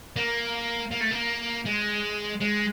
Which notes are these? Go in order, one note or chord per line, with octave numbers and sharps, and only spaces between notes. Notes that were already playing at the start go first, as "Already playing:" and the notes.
A#3
A#3
A3
A#3
G#3
G#3